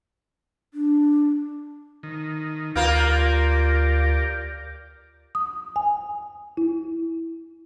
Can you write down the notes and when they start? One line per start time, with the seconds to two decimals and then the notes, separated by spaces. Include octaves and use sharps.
0.74 D4
2.03 D#3
2.76 D2 A#3 F4 G4 A#4 D5
5.35 D#6
5.76 G#5
6.57 E4